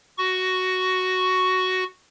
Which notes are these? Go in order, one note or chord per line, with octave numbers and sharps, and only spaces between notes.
F#4 C#6